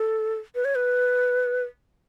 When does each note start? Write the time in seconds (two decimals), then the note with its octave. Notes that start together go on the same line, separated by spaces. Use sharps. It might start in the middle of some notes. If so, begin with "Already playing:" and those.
Already playing: A4
0.55 B4
0.65 C#5
0.75 B4